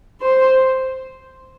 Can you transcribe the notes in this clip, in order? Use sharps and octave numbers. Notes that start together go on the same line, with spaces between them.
C5